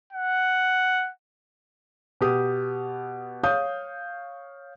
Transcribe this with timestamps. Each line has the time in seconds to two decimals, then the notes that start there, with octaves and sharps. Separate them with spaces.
0.13 F#5
2.21 B2 B3 G4 D#6
3.43 C#5 F5 D#6 G6